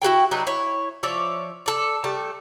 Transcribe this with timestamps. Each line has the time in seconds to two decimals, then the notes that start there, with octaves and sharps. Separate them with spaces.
0.02 E4 F#4 G#4 G5
0.31 F#3 D4 D#4 B4
0.47 E4 C#5
1.03 F3 C#5 D5 E5
1.66 A4 D5
2.04 G3 A3 A5